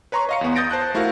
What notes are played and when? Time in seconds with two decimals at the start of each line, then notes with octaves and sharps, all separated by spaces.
0.12 B4 C#5 A#5 C6 C#6
0.29 D#5 F5 C#7
0.41 E2 B3
0.56 D#6 G6 A6 A#6 D7
0.70 C5 A5 F#6 G6
0.94 A3 E4 F#4 A#4 F5